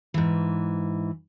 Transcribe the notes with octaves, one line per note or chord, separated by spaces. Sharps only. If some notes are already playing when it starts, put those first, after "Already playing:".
G#2 E3